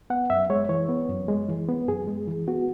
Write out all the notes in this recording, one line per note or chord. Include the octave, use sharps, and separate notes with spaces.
B3 F#5
F#2 E5
G#3 C#5
E3 C#5
B3
F#2
G#3
E3
B3
F#2 G#4
G#3
E3
B3 F#4